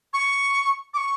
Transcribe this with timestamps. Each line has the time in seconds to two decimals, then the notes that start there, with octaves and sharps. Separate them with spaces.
0.14 C#6
0.94 D6
0.97 C#6